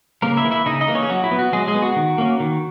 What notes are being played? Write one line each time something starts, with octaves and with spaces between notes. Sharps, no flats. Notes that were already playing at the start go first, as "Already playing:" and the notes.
C#3 A#3 A#4
E4 E5
E3 A#3
E4 E5
C#3 D#4 D#5
D#4 D#5
E3 A#3
C#4 C#5
G#4
F#3 F#4
E4
B3
F#4
F#3 G#3 G#4
G#3 G#4
B3
F#4
D#3
A#3 C#4
D#3